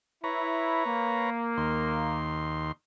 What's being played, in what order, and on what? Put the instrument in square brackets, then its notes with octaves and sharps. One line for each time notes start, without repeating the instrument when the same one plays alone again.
[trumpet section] E4 [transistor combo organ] B4 C#5 A#5
[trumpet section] A#3
[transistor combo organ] D#2 C6